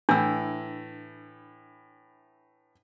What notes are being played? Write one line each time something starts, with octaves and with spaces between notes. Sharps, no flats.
A2 E3 D4 E6